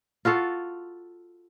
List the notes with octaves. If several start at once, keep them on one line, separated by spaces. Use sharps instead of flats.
F4 F#4 A4 F5